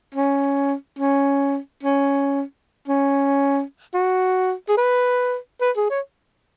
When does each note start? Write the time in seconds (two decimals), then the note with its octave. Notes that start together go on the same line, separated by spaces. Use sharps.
0.14 C#4
0.99 C#4
1.83 C#4
2.88 C#4
3.94 F#4
4.68 G#4
4.77 B4
5.61 B4
5.76 G#4
5.90 C#5